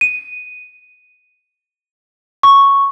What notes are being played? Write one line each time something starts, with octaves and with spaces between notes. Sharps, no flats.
D#7
C#6